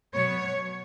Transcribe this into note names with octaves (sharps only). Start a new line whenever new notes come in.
B2 F#3 B3 C#5